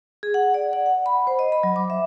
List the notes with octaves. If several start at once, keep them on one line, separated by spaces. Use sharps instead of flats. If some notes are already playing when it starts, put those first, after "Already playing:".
G#4
F#5
D5
F#5
F#5
B5
C5
D#5
B5
F#3
D6
E5